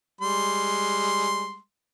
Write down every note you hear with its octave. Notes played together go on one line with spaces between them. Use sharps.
G3 G#3 C6